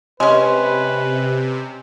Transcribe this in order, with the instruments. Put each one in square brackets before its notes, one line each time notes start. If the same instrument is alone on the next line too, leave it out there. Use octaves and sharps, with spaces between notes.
[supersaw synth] C3 [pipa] G#3 C#4 [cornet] B4